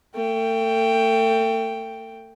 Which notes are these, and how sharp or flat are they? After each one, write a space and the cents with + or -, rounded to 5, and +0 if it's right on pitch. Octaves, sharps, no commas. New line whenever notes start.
A3 +35 G5 +0